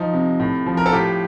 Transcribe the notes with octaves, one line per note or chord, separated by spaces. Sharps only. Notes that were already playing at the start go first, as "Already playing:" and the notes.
Already playing: F3 D#4
C3
A2
F3
A#4
A4
A2 G4